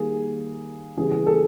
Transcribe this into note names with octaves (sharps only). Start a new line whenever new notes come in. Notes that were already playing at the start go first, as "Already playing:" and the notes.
Already playing: D#3 G3 A#3 G#4
C#3 E3 G3 B3 G#4
G#4
A4